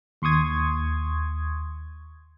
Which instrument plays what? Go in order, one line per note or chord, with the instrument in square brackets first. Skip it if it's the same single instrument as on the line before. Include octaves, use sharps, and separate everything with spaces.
[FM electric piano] D#2 C6 C#6 D#6 G#6